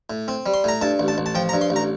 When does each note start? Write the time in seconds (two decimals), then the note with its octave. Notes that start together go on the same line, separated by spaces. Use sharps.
0.10 A2
0.28 C4
0.46 G3
0.54 C6
0.64 A2 A#5
0.81 G2 A5
1.00 A1
1.08 A5
1.18 A1
1.26 A5
1.35 F3 G5
1.49 A#5
1.53 G2
1.61 C6
1.70 A1
1.76 A#5